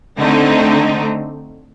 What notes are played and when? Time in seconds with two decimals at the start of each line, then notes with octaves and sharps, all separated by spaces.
0.18 D3 A3 C4 D#4